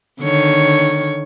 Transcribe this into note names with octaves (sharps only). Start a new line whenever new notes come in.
D3 D#3 C#5